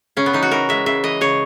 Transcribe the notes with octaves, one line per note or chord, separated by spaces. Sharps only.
C#3 C#4
B3
E3 D#4
F#4
E3 A#4
G#3 E5
C#3 E5
E3 D#5
C#3 C#5